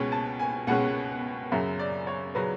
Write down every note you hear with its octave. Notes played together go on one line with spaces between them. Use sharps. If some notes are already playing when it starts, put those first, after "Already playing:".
Already playing: C#2 B2 G#3 C#4
A5
G#5
C#2 B2 G#3 C#4 F#5
F#2 C#3 F#3 E5
D5
C#5
C#3 F#3 B4